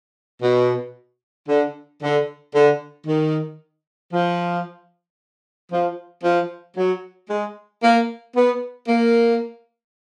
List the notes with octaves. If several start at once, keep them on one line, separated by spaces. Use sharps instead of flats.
B2
D3
D3
D3
D#3
F3
F3
F3
F#3
G#3
A#3
B3
A#3